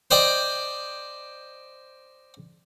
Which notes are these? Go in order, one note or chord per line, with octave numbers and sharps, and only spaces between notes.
C5 D5 D#5 G5